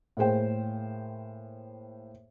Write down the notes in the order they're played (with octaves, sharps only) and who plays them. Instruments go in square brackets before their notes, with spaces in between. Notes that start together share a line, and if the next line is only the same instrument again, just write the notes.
[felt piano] A2 A#3 G#4 C5 G5